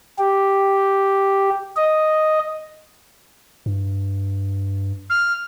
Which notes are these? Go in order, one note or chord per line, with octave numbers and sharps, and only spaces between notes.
G4
D#5
G2
F6